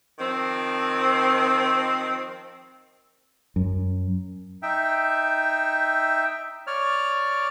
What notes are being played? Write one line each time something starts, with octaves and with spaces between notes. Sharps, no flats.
D#3 F3 C4
F#2
D#4 E5 G5
C#5 D5 F6